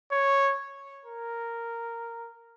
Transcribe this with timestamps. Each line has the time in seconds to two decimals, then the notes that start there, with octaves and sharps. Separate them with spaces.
0.12 C#5
1.05 A#4